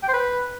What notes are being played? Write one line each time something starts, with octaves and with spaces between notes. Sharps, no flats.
G5
C5
B4